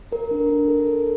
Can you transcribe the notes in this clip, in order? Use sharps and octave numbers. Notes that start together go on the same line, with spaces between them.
A4 A#4
D4
D4
A4
A4